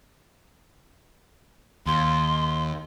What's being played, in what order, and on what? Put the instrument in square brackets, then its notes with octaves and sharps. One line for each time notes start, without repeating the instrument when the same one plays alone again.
[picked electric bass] D#2 [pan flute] C6